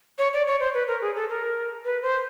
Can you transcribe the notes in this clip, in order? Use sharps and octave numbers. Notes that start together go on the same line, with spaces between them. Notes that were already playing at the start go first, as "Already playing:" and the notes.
C#5
D5
C#5
C5
B4
A#4
G#4
A4
A#4
B4
C5